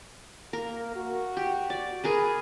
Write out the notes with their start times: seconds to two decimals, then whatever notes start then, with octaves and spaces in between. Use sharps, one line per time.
0.53 A#3 A#4
0.96 F#4
1.37 G4
1.70 D5
2.04 G#4 A#4 B4